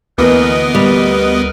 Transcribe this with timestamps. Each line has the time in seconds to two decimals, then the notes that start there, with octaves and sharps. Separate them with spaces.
0.18 D2 E3 A#3 B3 A#4 B4 D#5 F6
0.75 G3